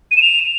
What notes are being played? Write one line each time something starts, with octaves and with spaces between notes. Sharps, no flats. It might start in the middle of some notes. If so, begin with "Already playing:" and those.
D#7
E7
F7